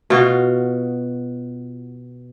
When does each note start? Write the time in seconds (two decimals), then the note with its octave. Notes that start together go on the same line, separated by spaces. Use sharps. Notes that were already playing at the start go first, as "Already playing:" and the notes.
0.10 B2 F4 F#4